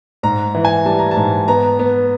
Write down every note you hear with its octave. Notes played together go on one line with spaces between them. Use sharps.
G#2 A#5
E3
G#5
G3 A5
A#5
A5
G#2
B3 A#5
B3